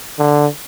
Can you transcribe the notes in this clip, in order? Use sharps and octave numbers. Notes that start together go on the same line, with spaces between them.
D3